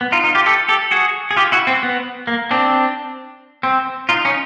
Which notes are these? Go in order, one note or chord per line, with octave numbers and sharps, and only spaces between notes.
B3
D#4 F4
D#4 F4
F4 G4
G4 A4
G4 A4
F#4 G#4
G#4
F4 G4
E4 F#4
C4
B3
A#3
C4 D4
C4
D#4 F4
C#4 D#4